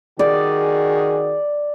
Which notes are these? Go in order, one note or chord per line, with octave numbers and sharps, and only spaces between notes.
D#3 F#4 G#4 D5